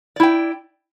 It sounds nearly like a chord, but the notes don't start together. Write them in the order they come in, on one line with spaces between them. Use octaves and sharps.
D5 E4 G5